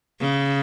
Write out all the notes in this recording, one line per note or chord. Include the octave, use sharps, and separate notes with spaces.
C#3